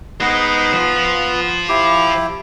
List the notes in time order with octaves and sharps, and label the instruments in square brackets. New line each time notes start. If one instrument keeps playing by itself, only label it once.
[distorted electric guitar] G#3 D#4 [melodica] B3 B4
[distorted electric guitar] F3 F4
[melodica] E4 G4 D6